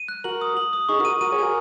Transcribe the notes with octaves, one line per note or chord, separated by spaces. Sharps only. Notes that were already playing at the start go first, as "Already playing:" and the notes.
Already playing: D#7
F#6
F#4 A#4 F#7
D#6
F#7
D#6
D#4 G#4 C#6
F#4 A#4 D#7
F#4 A#4 D#7
G#4 C#5
F#4 A#4 G#5